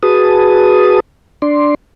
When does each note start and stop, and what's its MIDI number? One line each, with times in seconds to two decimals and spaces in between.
0.03 1.00 66
0.03 1.00 68
0.03 1.00 71
0.03 1.00 81
0.03 1.00 87
1.42 1.75 62
1.42 1.75 74
1.42 1.75 84